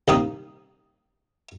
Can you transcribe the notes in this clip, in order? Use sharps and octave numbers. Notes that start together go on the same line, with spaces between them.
C2 D#3 A#3 D#6